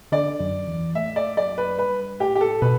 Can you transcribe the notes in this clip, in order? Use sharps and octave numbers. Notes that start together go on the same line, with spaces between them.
D3 D5
F#2
E2
A2 E5
D5
F#2 D5
B4
G2 B4
A2 G4
G4
A4
B2 B4